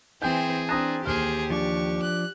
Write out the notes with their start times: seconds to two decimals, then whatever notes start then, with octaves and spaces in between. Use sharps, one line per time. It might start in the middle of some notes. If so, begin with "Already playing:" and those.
0.22 E3 C4 G#4 C5 G5 G#5 G6
0.69 C4 D4 A5 A#5 D#6 F#6
1.05 D#2 G4 G#4 C5 F6
1.50 F3 D4 C#6
2.02 F#6